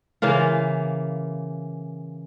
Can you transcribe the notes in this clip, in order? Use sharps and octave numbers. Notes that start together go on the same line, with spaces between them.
C#3 E3 A#3 F4